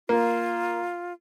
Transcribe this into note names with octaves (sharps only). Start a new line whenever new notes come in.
A#3 F4